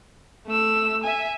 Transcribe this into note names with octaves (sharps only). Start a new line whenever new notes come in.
A3 E6
E5 G#5